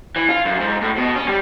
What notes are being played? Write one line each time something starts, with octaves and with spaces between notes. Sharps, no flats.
E3
F4
F#2
G#2
A2
B2
C#4
G3